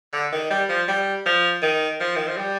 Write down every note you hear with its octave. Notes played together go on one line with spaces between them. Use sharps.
D3
D#3
G3
F3
G3
F3
D#3
F3
D#3
F3
G3